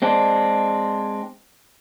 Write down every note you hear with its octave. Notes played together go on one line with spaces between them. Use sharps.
G#3 C4 D4